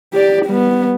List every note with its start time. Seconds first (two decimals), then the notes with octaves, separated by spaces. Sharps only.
0.13 G4 D5
0.46 G3 B3